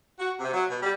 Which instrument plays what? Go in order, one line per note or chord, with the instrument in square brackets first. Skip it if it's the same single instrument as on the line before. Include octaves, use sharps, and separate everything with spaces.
[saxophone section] F#4
C3
F#3
B2
G3